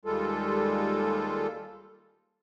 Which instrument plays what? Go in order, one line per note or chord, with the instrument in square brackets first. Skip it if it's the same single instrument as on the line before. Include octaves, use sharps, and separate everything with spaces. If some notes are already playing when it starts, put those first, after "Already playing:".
[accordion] D#2 G3 G#3 F4 A4